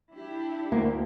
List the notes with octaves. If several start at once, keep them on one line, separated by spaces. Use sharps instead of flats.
D4 E4 G4
D2 A#3